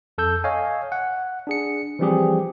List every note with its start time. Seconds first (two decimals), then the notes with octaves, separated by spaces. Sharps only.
0.18 F2 A4 E6 G6
0.44 C#5 D#5 F5 G#5
0.92 F#5
1.47 D4 G#4 C#7
1.99 E3 F3 G3 C4 G4 G#4